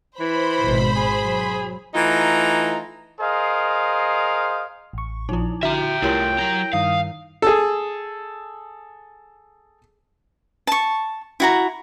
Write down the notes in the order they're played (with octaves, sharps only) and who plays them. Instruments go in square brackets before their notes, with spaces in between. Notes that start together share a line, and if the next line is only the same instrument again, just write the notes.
[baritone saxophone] E3 [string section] C5 B5
[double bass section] G#1 B2
[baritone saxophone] G#4
[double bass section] F#3
[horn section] E3 A3 D#4 F4 A#5
[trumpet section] G#4 A#4 C5 D#5 F5
[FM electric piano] A1 C#6
[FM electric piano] A#1 F3 [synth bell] D#4 E4
[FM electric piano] D3 E4 [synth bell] F#4 [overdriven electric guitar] E5 A#5 [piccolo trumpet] G5
[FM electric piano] C2 G4 C6 [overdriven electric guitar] A3 F4 [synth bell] E4 A#4 C#5
[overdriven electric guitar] F#3 A#5 [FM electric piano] G6 A#6
[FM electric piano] G2 D#3 [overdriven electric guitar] F5 [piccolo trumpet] D#6
[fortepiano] G#4 A4
[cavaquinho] A5 C#6
E4 F#4 A#5